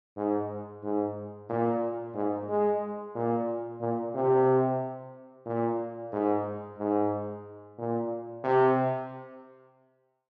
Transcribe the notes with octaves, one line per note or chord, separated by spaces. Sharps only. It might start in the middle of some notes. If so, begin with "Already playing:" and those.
G#2
G#2
A#2
G#2
G#3
A#2
A#2
C3
A#2
G#2
G#2
A#2
C3